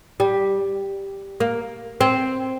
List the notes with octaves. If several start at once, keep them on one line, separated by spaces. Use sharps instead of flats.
G3
A#3
C4